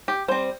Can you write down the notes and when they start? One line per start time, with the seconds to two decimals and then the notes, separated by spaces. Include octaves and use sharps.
0.08 G4
0.28 G3 C4 C5